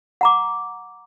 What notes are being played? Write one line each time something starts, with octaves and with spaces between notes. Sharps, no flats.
F#5 A#5 D6